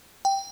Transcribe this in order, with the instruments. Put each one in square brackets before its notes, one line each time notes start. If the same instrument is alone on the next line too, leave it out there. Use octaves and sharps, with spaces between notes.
[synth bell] G5